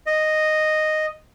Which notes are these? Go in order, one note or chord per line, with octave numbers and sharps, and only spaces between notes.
D#5